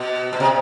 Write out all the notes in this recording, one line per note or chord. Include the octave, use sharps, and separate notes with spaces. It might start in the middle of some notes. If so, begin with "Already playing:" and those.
Already playing: B2
B2
C3